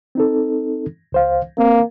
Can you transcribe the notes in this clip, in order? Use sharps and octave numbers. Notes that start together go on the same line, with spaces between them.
C4 D#4 A4
C#2 C5 F5
A#3 C4